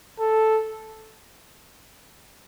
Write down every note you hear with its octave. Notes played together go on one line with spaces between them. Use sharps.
A4